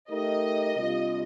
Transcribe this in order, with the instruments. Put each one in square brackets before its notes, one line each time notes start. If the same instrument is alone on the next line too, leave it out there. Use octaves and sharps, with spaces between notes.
[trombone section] A3 D#4 G4 A#4 [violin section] D#5
[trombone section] C3 G3 D4 F4